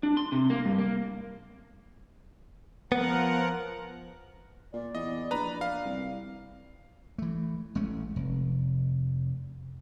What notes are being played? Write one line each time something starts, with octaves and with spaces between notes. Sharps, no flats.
D4
C6
C3
A#3
G2
A#3
F3 B3 A#4 F#5
A#2 D5
E2 D#5
A#1 B4 A#5
F5
C2
E3 A3
A1 G#3 A3 C#4
F1